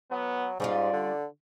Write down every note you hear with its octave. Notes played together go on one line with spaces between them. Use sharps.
F#3 B3
G#2 G3 C#4 F4 D5
D3